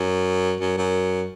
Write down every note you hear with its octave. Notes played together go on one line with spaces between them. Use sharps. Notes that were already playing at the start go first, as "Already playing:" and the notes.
Already playing: F#2
F#2
F#2